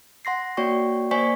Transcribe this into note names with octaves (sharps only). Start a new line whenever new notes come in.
F#5 C6 A#6 C7
A#3 F#4 C#5 D5 G5 C#6
A#3 C5 D5 G#5 C#6 B6